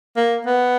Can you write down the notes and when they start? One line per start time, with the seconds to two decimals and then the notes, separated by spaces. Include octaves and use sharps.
0.17 A#3
0.46 B3